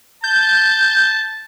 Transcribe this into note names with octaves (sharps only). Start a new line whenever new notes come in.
A5 G6